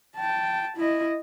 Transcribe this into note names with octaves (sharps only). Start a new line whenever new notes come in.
G5 A5
E4 D#5